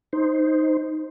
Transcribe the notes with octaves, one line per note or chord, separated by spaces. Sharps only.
D#4 C5